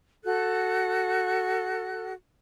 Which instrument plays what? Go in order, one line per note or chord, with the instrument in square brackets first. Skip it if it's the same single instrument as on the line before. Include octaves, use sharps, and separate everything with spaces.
[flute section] F#4 A4 F#6